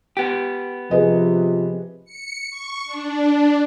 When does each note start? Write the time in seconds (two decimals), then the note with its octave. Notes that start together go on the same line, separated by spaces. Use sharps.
0.17 B3 G4
0.91 C3 F3 G#4 B4 D#5
2.05 C#7
2.50 C#6
2.85 D4